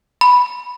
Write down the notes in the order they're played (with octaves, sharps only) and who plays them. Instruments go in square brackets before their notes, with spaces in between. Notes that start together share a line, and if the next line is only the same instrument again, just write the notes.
[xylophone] B5